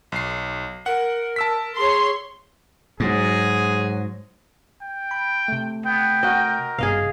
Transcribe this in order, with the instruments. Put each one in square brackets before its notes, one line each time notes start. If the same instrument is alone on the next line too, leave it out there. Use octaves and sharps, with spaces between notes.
[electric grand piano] B1 C7
[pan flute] A#4 [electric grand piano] F#5
[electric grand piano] A5 E6 B6
[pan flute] G#4 [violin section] C#5 C6
[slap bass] G#2 [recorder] F#3 [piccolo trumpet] G#4
[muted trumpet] G5
[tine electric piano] B5
C3 A3
[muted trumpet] B3 [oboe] G5
[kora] F#4 D#5 [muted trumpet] A#4
[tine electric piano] G#1 G2 C3 [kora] G#4 D#5 F5